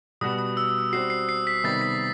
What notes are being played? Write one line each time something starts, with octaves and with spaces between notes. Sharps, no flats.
B2 G3 B3 F#4 D#6
D#6
E6
G3 C4 F#4 C7
C7
C7
B6
C3 D#3 G3 B3 A6
B6